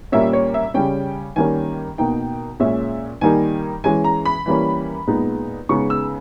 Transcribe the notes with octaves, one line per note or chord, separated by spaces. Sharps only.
A#2 G3 A#3 C#4 E5
C#5
E5
C#3 G3 C#4 G5
D#3 G3 A#3 C#4 G#5
B2 A#3 D#4 G5
A#2 G#3 C#4 E5
D#3 G3 A#3 D#4 G#5
E3 G#3 C#4 G#5
A#5
B5
E3 G3 A#3 C#4
A#2 G#3 B3 D#4
C#3 G#3 B3 D#4 C#6
E6